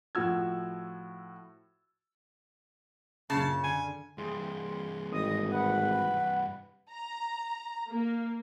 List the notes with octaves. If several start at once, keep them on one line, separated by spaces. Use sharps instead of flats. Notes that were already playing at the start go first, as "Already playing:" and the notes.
A2 F3 F#4 E6 G#6
F#2 A#2 C#3 A5
D3 G#5
G2 E3 G#4 C6
G#1 D#5 D#6
B4 F#5
A#5
A#3